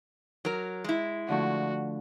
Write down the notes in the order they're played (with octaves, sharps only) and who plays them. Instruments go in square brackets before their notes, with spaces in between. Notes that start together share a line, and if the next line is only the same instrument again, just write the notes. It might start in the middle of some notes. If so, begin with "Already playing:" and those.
[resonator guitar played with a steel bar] F#3 A#4
G#3 E4
[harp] D3 F3 A3 [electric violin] F#4